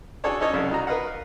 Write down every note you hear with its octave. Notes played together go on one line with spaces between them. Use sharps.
D4 F#4 G#4 A4 C#5 D5
C#4 D#4 A4 C#5 D#5
C2 C#3 G3
D#4 F#4 A#5
A#4 B4 D#5 F5 F#5
F5